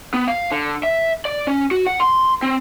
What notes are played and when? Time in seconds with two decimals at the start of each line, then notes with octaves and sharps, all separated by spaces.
0.14 B3
0.28 F5
0.52 D3
0.83 E5
1.25 D5
1.47 C#4
1.71 F#4
1.87 F#5
2.00 C6
2.43 C4